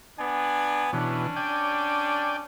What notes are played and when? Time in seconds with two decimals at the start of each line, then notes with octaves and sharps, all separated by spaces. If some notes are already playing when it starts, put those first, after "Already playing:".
0.19 B3 D4 G#5
0.93 B2 E3 C#4 D4
1.36 D5 G5 G#5